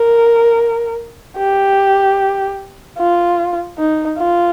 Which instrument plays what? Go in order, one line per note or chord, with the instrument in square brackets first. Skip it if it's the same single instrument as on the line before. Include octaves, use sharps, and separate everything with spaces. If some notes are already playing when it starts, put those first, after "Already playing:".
Already playing: [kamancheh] A#4
G4
F4
D#4
F4